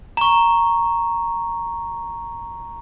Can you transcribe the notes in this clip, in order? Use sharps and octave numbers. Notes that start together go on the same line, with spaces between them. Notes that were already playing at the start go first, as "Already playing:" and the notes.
A#5 C#6